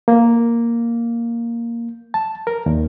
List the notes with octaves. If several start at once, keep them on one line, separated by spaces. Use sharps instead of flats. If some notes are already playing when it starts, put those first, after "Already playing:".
A#3
A5
A#4
D#2